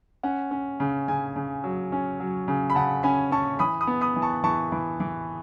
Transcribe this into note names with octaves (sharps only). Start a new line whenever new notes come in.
C#4 F#5
C#4
C#3
C#3 G#5
C#3
F#3
C#4
F#3
C#3
B5
C#3 F#5 A5
C#4 G#5 B5
C#4 A5 C#6
E3 B5 D#6
B5 D#6
B3
B5 D#6
E3
A5 C#6
E3 A5 C#6
E3
E3